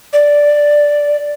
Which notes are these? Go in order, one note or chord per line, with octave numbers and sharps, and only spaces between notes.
D5